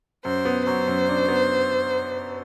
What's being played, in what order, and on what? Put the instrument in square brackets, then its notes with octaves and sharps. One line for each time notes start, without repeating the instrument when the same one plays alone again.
[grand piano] F#2 [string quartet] C5
[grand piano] B3
[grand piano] F#3 [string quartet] C5
[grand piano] F#2
D4
B3